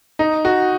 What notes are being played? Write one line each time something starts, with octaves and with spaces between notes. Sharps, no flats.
D#4
F#4